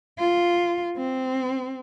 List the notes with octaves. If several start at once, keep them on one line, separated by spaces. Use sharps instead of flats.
F4
C4